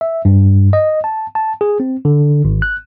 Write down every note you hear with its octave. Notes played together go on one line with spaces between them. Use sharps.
E5
G2
D#5
A5
A5
G#4
C4
D3
G#1
F#6